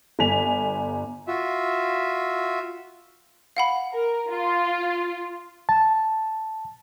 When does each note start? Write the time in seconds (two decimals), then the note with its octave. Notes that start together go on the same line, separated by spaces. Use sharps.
0.19 G1 G#5 B6 F7
1.27 F4 F#4 E5
3.57 F5 F#5 B5
3.92 A#4
4.29 F4
5.69 A5